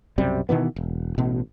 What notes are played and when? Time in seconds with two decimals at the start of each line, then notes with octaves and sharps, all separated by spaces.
0.18 B1 F#2 C3 G3
0.49 B2 D#3 E3 B3
0.76 E1
1.18 A1 B2